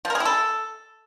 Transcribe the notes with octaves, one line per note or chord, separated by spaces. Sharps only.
F3
A#4
G#4
E4
A4